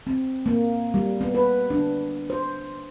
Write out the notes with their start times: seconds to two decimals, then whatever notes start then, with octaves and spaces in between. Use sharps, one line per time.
0.07 C4
0.46 A#3
0.94 G3
1.21 B3
1.35 B4
1.70 D4
2.30 C5